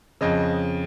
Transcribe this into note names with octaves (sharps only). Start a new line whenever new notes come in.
F2 C#3 D#5